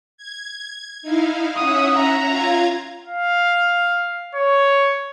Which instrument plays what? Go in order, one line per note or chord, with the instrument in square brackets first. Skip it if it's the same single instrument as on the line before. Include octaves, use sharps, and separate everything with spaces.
[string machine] G#6
D#4 E4 F5
[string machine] C#4 E5 F#5 [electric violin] D#6
[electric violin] A#5
[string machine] F4 F5 G#6
[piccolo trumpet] F5
C#5